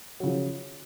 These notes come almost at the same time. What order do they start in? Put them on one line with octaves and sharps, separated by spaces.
F#3 C#3 F3